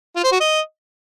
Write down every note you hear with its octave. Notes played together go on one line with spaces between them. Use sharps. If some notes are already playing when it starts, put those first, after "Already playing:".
F4
C5
F#4
D#5